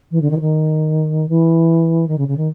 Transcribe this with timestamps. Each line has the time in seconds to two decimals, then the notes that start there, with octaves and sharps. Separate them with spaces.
0.11 E3
0.21 D3
0.30 D#3
0.36 E3
0.41 D#3
1.29 E3
2.08 D#3
2.18 C#3
2.28 C#3
2.37 D#3